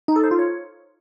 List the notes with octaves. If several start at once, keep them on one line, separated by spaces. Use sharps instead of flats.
D#4
A4
C5
F4
C#5